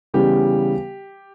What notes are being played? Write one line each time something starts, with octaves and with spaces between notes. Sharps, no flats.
C#3 E3 G3 B3 G4